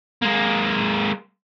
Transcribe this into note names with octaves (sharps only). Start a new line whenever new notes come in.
G#3 A#3